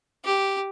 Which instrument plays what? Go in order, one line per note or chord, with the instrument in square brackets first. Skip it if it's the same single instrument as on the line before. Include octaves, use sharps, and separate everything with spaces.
[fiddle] G4